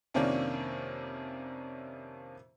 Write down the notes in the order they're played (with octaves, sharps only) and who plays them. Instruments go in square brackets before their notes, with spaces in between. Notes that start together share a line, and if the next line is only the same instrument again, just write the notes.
[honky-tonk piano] F2 C3 D#3 A#3 C#4 D4